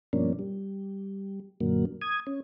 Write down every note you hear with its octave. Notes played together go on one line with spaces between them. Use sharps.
G2 B2 F3 A#3 C#4 D4
G3
F#2 A#2 D3 F#3 A#3
D#6 G#6
C#4